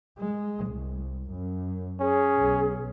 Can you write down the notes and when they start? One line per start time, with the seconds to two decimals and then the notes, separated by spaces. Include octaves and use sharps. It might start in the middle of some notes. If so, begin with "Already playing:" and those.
0.18 G#3
0.65 C2
1.31 F#2
2.01 C#4 G#4
2.37 B1